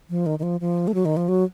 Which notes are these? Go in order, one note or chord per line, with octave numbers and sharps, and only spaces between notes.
F3
D#3
D#3
F3
F3
A3
F#3
D#3
F3
F#3